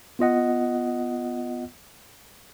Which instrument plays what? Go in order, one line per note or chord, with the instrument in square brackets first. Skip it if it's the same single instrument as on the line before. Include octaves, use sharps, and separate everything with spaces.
[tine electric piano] B3 F4 D#5 F#5